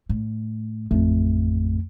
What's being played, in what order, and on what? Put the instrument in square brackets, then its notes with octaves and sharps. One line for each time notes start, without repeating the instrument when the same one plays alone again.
[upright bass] A2
[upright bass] A1 [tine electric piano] F2 A3